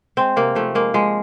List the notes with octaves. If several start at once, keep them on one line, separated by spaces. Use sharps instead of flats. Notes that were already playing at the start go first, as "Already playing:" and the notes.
G#3 C4
C3 A#3
F3 A3
G#3 A#3
F3 G#3